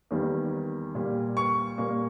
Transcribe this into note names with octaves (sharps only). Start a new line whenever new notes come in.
E2 D#3 G3 A#3
A#2 G3 A#3
C#6
A#2 G3 A#3